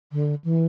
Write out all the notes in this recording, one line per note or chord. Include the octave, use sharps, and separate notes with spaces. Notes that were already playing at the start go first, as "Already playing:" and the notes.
D3
E3